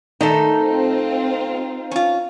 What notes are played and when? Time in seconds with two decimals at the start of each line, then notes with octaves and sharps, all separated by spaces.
0.21 D#3 A3 D#4 A4
0.60 C4 F4
1.91 C#4 F4